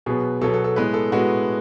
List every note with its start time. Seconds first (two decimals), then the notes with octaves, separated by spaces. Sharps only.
0.06 B2 F#3 B3 G#4
0.41 B2 F#3 B3 A4
0.53 A4
0.64 A4
0.76 A2 G#3 B3 B4
0.94 A4
1.12 A2 G#3 B3 F#4